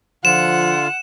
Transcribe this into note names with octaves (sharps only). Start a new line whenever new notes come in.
D3 F3 F4 F#5 E7